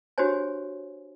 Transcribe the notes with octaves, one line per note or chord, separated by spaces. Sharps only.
D4 F#4 G4 C5 C#5 G#5